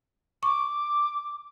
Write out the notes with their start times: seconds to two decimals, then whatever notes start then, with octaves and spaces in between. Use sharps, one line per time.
0.43 C#6 D6